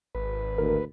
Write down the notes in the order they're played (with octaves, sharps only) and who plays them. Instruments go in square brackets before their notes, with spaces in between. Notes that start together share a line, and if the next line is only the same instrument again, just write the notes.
[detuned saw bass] G#1 [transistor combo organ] B4
[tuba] D2 [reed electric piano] A#4